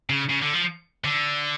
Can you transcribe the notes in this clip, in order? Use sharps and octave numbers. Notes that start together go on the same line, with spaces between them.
C#3
C#3
D3
F3
D3